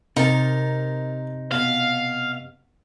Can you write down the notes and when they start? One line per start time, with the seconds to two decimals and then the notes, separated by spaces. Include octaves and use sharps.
0.16 C3 D#4 A#4 A5
1.51 B2 F5